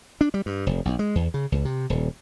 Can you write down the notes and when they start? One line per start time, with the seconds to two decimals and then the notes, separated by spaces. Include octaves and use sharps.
0.21 D4
0.34 G3
0.46 G2
0.67 F1
0.85 B1
0.99 G#3
1.15 E2
1.34 C#3
1.52 C#2
1.65 C3
1.90 D#1